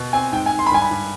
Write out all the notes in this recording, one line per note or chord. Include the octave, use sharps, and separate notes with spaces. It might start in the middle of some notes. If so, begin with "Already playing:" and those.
Already playing: B2
C4 G#5
G#2 G5
G#5
G#2
C6
B5
G2 G#5
B5
G2